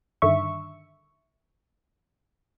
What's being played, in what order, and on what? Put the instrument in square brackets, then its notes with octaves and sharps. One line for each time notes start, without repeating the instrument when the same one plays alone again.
[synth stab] G2 D3 D#3 E5 C#6